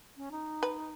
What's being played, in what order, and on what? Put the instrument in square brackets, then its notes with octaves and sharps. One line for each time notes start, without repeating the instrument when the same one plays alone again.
[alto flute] C#4
D#4
[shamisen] B4